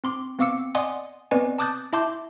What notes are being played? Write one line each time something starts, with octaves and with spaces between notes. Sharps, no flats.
C4 C6 D6
B3 C4 F5 D6 E6 C#7
D5 D#5 F#5 G#5 C6 D#6
B3 C4 B4 D5 D#5 G#5
A5 D6 D#6 F#6 G6 A6
E4 E5 A5 C6 D6 G6